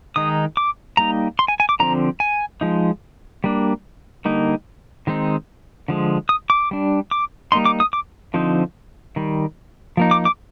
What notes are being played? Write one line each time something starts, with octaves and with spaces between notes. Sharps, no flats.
D#3 G#3 D#4 D#6
D6
G3 A#3 D#4 A#5
C6
G#5
G#5
D6
D3 F3 C4 A#5
G#5
F3 G#3 D#4
G3 A#3 D4
D3 G3 A#3 D#4
D#3 G#3 C4 D#4
D3 F3 G#3
D#6
D6
G3 D4
D6
G3 A#3 D#4 C6
D6
D#6
D6
D3 F3 C4 D#4
D#3 G3
F3 A#3 D#4
D6
D6